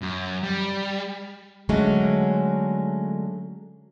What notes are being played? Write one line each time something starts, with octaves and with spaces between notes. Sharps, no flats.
F#2
G3
D3 F#3 G#3 A3 C#4